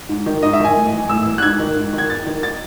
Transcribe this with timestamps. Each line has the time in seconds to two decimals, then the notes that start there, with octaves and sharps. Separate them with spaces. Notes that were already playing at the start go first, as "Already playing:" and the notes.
0.09 G#2
0.26 D#3
0.42 G#2 D#5
0.53 E5
0.60 D#3 G#5
0.76 A2
0.92 E3
1.09 A2 E6
1.26 E3
1.38 F#6
1.42 G#2 G#6
1.59 D#3
1.76 G#2
1.93 D#3
1.98 G#6
2.09 E2 A6
2.26 D#3
2.43 A6